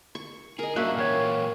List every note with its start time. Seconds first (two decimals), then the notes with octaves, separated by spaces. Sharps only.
0.15 C#6
0.59 G#4 A#4 D#5
0.76 G3 A#3 C#4 D4 F#4 E5 C#6 F#6
0.97 A#2 E3 C#5 F5 G5